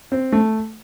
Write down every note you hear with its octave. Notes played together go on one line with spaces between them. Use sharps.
C4
A3